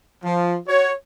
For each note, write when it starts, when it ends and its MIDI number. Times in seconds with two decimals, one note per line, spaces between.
0.24 0.56 53
0.68 0.91 66
0.68 0.91 73